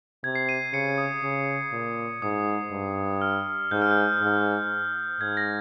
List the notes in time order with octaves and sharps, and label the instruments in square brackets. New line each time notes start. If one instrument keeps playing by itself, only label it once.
[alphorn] C3 [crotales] G#6
[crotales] C7
D#7
[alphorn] C#3 [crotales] C#7
[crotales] D#6
[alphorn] C#3
A#2
[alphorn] G#2 [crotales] D#6
[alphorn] G2
[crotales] F6
[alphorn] G#2 [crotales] G6
[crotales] F6
G6
[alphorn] G#2
[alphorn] G#2 [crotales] G#6
[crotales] A#6